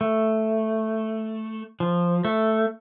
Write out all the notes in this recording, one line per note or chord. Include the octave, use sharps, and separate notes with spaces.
A3
F3
A3